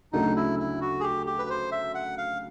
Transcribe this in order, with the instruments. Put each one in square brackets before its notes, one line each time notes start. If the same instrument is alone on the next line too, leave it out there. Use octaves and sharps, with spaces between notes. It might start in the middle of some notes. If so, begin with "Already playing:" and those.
[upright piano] D2 C#3 F#3 A3 D4 [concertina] D#4
[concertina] E4
E4
F#4
G#4
G4
G4
B4
C5
E5
F#5
F5